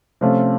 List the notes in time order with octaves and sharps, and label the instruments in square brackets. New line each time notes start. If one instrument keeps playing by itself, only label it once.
[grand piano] C3 F3 A3 C#4 F4